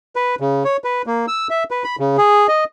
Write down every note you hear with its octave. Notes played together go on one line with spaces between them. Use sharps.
B4
C#3
C#5
B4
A#3
E6
E5
B4
B5
C#3
G#4
D#5